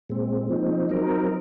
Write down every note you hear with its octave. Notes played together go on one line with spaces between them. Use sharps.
A#2 G#3 C4
F3 C4 D#4
F#3 C4 D#4 A#4